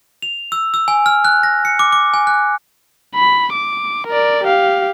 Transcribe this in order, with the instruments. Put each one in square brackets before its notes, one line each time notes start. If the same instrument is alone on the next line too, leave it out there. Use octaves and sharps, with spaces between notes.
[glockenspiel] F7
E6
E6
G#5
F6
F#6
A#6
C#7
D6
D6
G#5
F#6
[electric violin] B5
D6
A#4 D5
G4 F5